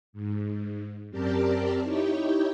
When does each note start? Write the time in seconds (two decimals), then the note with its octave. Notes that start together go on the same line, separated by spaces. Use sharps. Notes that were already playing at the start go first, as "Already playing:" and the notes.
0.13 G#2
1.10 F#2 C4 G4 A#4 D5 A5
1.82 D#4 E4 G4 C#5 G5